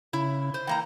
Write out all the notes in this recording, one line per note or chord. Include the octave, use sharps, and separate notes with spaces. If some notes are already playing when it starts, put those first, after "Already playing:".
C#3 E4
C5
E3 A#3 G5 A#5